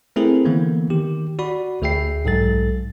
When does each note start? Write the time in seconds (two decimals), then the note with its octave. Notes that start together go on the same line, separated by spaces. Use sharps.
0.16 A3 C4 E4 G#4 A#4
0.45 D3 E3 A#3 B3
0.90 D#3 G4
1.39 F#4 D5 B5
1.82 D2 G#4 E5 G5 C7
2.25 B1 G#2 F#3 A4 A6